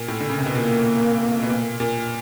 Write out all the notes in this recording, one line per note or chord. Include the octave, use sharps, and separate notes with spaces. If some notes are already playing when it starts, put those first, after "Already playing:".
Already playing: A#2
A2
D3
C#3
C3
B2
A#2 A#3
B2
A#2
A#2